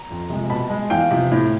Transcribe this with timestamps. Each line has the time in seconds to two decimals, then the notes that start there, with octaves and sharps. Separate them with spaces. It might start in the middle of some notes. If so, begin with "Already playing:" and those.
Already playing: A#5
0.10 F2
0.30 C3 F3 G#3
0.50 B2 A5 B5
0.70 G#3
0.90 E2 F5 G5
1.11 C3 F3
1.32 A2